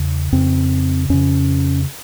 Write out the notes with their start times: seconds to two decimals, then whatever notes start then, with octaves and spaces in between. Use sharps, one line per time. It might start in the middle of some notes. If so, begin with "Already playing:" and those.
Already playing: E2 C#3
0.32 F2 C#3 C4
1.09 F2 C#3 C#4